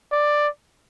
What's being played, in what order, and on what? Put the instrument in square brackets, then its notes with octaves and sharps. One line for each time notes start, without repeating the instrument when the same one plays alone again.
[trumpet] D5